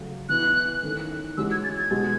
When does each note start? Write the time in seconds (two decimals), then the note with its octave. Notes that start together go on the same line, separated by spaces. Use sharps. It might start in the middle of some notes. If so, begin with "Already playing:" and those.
Already playing: C#3 F#3 A3
0.29 E3 B3 E4 F#6
0.82 D#3 A3 C#4
1.37 E3 G#3 C#4 F#4 E6
1.51 G#6
1.64 A6
1.77 G#6
1.91 B2 G#3 B3 F#4